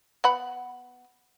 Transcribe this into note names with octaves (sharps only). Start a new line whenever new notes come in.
B3 F#5 B5